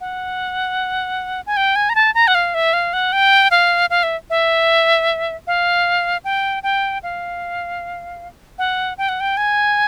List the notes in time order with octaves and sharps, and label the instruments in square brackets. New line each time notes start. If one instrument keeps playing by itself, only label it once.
[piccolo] F#5
G#5
G5
G#5
A#5
A5
A#5
F#5
F5
E5
F5
F#5
G5
F5
F5
E5
E5
F5
G5
G5
F5
F#5
G5
F#5
G5
G#5